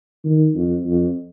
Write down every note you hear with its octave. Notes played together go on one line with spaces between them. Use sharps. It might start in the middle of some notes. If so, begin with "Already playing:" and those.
D#3
F2
F2